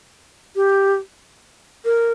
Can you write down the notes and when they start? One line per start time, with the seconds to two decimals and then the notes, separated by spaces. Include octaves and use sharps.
0.56 G4
1.85 A#4